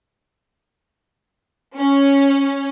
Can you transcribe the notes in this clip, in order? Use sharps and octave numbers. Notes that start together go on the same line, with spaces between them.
C#4